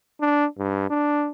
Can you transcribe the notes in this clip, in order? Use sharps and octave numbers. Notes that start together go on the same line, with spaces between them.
D4
G2
D4